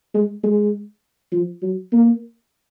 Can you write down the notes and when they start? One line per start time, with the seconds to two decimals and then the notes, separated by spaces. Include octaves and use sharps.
0.14 G#3
0.44 G#3
1.32 F3
1.62 F#3
1.92 A#3